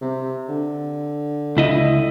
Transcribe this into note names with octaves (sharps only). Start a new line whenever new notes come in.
C3
D3
C#2 E4 D#5